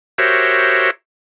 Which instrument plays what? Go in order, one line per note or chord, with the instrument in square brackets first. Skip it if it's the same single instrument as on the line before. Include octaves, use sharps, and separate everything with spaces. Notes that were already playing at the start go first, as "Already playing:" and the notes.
[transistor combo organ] F#4 G4 A#4 C5 C#5 E5